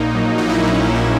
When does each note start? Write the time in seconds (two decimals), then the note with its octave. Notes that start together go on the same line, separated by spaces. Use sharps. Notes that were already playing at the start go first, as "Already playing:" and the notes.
Already playing: A#1 A#2 A#3 D#4
0.15 F#3
0.38 A#2 D#4
0.49 E4
0.60 A#3 D#4
0.73 C#4
0.83 A#1 D#4
0.95 E4